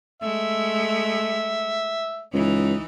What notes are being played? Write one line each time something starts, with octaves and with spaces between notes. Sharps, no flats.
G#3 A3 E5
C#2 E3 D#4